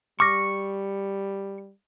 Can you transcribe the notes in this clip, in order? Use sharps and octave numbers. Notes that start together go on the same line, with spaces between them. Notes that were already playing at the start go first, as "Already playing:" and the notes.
G3 C#6 D6 F6 A#6